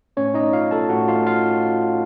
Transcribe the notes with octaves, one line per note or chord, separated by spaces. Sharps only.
A2 A3 C#4 C#5
D#4 D#5
F4 F5
A4 A5
A2 A3 F#4 F#5
F4 F5
F4 F5